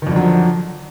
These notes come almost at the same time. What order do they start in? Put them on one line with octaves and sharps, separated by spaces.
D#3 F2 D3 F#3 F3